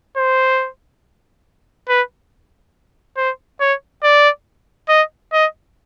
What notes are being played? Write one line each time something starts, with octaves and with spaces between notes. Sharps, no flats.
C5
B4
C5
C#5
D5
D#5
D#5